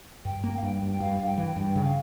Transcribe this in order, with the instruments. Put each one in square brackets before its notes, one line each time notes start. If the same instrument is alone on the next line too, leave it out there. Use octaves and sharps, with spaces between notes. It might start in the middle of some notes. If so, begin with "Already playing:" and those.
[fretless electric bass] G2 [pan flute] G5
[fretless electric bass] A#3
[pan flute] F5
[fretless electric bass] G2 [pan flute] G5
[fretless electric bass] G2
[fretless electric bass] G2 [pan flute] F5
[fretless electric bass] G2
[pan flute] G5
[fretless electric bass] E3
[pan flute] G5
[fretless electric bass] G2
[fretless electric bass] C#3 [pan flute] G5
[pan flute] F5